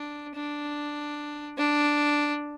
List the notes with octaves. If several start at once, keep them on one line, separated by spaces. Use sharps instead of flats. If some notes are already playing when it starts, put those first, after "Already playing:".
Already playing: D4
D4
D4